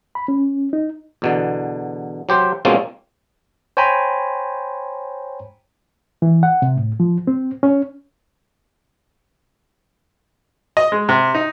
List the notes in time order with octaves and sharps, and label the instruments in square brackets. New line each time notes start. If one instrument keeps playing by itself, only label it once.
[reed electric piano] B5
C#4
D#4
[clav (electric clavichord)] E2 B2 D3
F#3 G4 C5
B2 F3 G#3 A#3 C4 C#4
[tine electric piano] C5 C#5 G5 G#5 A#5 B5
[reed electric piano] E3
F#5
C3
A2
F3
C4
C#4
[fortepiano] D#5
G#3
C3
D#4